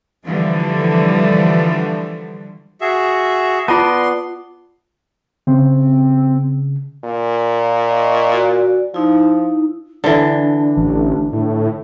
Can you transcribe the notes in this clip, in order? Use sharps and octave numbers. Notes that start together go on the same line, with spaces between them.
D3 E3 F3 G3 A3
F#4 G#4 E5
B3 F4 D5 A5 C6
C#3 C4
A#2
D#5 C#6
F#4 D5
F3 D#4 E4
D3 E3 D4
A1
A2